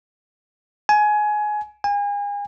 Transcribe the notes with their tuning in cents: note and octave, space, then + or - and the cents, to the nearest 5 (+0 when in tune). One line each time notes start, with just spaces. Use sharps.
G#5 +20
G#5 -35